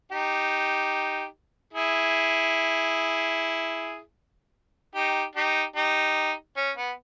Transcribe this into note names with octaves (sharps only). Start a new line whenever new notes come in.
D#4 G4
E4 G#4
D#4 G4
D#4 G4
D#4 G4
C#4
B3